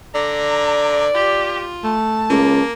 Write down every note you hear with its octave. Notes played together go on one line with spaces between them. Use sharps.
D3 D5 A#5
F4 G4
A3 A5
C#2 A#3